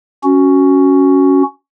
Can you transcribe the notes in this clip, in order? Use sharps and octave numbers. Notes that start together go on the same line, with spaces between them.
C#4 F#4